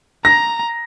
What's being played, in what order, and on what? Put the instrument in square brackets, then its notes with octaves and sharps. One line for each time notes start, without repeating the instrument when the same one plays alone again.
[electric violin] A#5 [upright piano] A#6